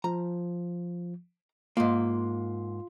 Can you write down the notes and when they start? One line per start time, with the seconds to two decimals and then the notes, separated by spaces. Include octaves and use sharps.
0.04 F3 A#5
1.77 G#2 A#3 F4 C6